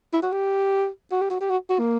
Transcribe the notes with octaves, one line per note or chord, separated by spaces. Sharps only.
E4
F#4
G4
F#4
G4
F#4
G4
F#4
F#4
A#3